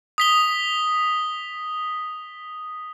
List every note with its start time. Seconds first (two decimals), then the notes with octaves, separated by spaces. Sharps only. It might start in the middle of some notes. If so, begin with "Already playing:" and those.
0.18 D#6 B6 G7